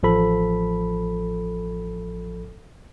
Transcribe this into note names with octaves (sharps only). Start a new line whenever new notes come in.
A1 F3 A4 B5